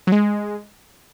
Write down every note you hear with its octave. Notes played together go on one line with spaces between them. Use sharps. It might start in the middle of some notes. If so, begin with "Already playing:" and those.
F#3
G#3